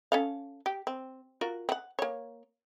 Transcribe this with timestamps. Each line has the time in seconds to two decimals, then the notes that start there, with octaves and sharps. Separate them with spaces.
0.12 C#4 A4 F5
0.66 G4
0.87 C4
1.41 F4 F#4 A#4
1.69 C4 F#5
1.99 A#3 C#5